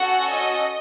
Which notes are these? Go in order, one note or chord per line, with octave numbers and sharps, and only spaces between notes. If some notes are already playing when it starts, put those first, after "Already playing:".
Already playing: C#4 F#4 A4 F#5
D#5